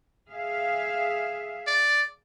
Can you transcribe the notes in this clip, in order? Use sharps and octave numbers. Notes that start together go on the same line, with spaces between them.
G#4 E5 F5
D5